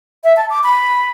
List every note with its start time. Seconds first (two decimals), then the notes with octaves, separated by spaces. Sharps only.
0.24 E5
0.37 A5
0.50 D6
0.64 B5